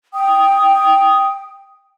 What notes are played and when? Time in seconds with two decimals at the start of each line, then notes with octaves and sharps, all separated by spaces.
0.14 G5 D#6